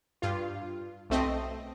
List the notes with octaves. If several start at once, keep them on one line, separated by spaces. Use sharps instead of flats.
G2 F4
B1 A3 C4 D#5